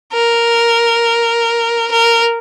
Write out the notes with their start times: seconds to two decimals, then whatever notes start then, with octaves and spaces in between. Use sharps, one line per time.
0.13 A#4
1.91 A#4